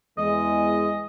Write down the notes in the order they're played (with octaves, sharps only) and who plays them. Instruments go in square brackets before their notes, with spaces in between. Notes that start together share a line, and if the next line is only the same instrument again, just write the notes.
[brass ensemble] E2 G#3 [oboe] D#5